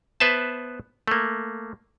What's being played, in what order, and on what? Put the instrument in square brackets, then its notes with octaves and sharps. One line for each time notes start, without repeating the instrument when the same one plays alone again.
[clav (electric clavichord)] B3 B4 C5 E5 A5
A3 A#3